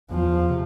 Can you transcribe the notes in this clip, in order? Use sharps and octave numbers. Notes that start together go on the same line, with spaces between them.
E2 F3
C3